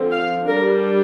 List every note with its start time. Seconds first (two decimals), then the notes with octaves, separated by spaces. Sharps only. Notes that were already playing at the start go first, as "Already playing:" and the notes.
Already playing: D3 F3 C4
0.11 F5
0.48 G3 D4 A#4